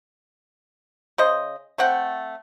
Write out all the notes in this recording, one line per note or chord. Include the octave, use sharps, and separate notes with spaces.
C#3 C5 D#5
A3 C4 F#5 G5